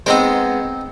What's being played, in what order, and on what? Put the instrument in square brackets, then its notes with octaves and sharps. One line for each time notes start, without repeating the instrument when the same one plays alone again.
[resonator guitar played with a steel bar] G#3 B3 [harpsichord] C4 D#4 C5